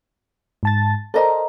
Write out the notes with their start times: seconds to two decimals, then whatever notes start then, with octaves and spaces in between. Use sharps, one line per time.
0.63 G#2 A5 A6
1.14 A4 A#4 C5 D5 D#5 A#5